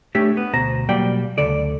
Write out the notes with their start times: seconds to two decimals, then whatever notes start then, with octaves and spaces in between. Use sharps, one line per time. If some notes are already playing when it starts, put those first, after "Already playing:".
0.15 A3 D4 G4 C#5
0.37 B3
0.53 D2 B2 C5 A#5
0.89 B2 F#3 G3 A#3 D5 G5
1.38 D2 C#3 A4 D5